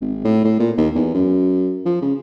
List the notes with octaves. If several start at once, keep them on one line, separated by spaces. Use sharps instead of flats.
G#1
A2
A2
A#2
D#2
E2
F#2
F3
C#3